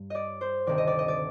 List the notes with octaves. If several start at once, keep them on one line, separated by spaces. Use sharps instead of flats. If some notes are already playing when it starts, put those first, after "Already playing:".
Already playing: G2
D5 D#5
C5
D2 C3 D#3 D5
D#5
D5
D#5
D5